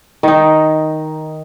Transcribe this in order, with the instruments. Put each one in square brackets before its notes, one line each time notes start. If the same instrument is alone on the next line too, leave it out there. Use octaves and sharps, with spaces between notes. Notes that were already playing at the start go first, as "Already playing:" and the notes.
[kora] D#3 D#4